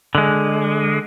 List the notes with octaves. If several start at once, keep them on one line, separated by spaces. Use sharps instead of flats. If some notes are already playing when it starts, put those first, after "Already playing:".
D3 G#3